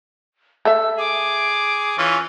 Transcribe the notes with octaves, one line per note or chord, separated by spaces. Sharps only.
A3 A4 E5 E6
G#4 D6
E3 C#4 F4